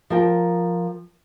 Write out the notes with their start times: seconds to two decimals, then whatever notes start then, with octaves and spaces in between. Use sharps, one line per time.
0.10 F3 A#4 G5